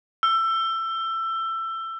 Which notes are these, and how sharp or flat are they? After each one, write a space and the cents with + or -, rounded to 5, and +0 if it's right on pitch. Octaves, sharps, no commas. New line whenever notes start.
E6 +20